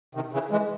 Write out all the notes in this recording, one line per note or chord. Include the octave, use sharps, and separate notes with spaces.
C3 D#3
C#3 E3
E3 G#3